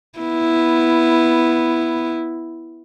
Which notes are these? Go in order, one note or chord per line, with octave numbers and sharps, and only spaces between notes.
B3 E4